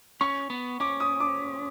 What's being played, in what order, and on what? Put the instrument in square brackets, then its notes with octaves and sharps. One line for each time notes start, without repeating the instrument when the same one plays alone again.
[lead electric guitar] C#4 [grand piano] C#6
[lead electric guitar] B3
[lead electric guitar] C#4 [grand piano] D6
[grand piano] D#6
D6